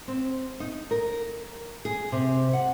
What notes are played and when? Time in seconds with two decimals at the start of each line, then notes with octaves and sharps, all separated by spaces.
0.08 C4
0.60 D#4
0.91 A#4
1.85 G#4
2.12 C3
2.53 F#5